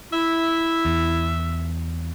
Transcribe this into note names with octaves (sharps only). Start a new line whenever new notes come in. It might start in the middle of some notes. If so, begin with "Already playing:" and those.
E4 E5
E2